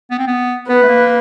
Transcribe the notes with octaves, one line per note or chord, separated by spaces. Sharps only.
B3
C4
B3
B3 B4
A3
A#3